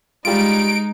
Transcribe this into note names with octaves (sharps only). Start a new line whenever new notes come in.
G3 G#3 D#4 F4 D7